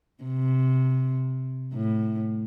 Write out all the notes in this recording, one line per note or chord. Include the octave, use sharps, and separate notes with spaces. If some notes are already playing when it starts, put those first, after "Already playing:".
C3
A2